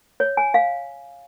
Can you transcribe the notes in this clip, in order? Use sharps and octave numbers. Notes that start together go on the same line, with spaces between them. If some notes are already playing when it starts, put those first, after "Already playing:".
C#5
G#5
F5